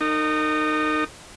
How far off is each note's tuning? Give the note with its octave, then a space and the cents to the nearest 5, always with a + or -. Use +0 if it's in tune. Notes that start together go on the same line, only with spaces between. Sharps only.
D#4 -20 A#4 -35